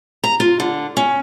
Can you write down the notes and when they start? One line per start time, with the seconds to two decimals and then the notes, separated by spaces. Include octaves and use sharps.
0.24 A#5
0.40 F4
0.60 D3
0.97 C#4